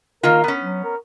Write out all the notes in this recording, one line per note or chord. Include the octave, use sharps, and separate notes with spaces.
D#3 A#3 F4 A#4
B3 C#4
F#3
A#4